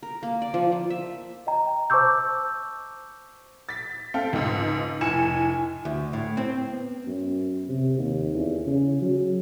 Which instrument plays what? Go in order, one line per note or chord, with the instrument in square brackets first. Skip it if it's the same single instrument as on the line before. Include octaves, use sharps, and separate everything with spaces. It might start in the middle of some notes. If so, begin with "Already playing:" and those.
[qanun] A#4
A#3
D5
F3
F3
E5
[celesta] D#5 G5 A#5
C5 A5 C#6 D6 E6 G6
[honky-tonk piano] A6 B6
C4 A4 F5 G5
C#2 G#2
F1 A2 G#5 C#7 E7
[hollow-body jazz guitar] D2
A2
C4
[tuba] B3
F#2
C3
D#2
E2
C#3
F#3